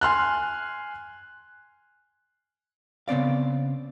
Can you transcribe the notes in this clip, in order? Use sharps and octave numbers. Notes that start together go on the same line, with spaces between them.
G#5 C6 F6 F#6
C#3 B3 C4 D5 F5